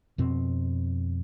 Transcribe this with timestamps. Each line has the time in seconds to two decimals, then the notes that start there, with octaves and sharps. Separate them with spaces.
0.18 F2 B2 C4